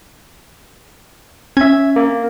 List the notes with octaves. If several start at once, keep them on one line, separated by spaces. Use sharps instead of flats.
C#4 E5 G#6
A#3